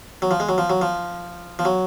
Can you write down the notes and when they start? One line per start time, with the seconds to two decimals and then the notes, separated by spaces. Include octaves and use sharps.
0.22 F#3
0.31 F3
0.40 G#3
0.49 F#3
0.58 F3
0.70 F#3
0.82 F3
1.59 F3
1.65 F#3